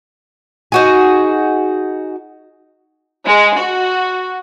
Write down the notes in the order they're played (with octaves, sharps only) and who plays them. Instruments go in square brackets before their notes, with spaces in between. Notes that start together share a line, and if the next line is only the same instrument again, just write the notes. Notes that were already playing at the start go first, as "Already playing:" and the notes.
[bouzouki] D#4 F#4 G#4
[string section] G#3
F#4